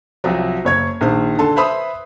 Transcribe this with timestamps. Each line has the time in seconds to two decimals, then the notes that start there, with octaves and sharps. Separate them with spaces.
0.24 C2 F3 F#3
0.65 F#1 C#5 G#6
1.01 A#1 D#3 C5
1.38 D3 A4 C6
1.56 B4 C5 E5 B5 C6 D#6